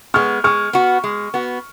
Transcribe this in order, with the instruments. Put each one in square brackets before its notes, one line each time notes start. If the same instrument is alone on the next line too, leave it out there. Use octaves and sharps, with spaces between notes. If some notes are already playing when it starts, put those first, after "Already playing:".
[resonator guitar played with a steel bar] G#3 B3 [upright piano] C#6 F6
[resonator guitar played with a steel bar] G#3 [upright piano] C#6 F6
[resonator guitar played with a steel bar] B3 F#4
G#3
B3 F#4